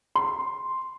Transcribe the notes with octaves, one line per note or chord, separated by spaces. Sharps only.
C6